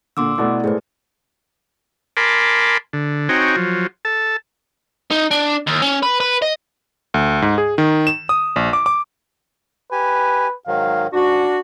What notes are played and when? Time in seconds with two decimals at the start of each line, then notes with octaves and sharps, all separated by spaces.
0.17 A#2 D3 C6 D6 E6
0.38 B2 A3 B3 E4 D5
0.64 A2 G#3 G#4 A4 B4 C5
2.17 A#4 G#5 A5 B5 C6 D6
2.93 D3
3.29 C4 D#4 F#4 C#5 G5 G#5
3.56 F3 F#3
4.05 A4 A5
5.12 D#4
5.31 D4
5.67 D#2
5.82 C#4
6.03 B4
6.20 B4
6.42 D#5
7.14 D2
7.42 G#2
7.58 G#4
7.78 D#3
8.07 E7
8.29 D#6
8.56 A#1
8.73 D6
8.86 D6
9.92 G4 B4 G#5
10.67 G#2 D#3 F#3 F5
11.13 G#2 D4 F#4